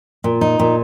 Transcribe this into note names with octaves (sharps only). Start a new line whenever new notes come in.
A#2
D#4
A#2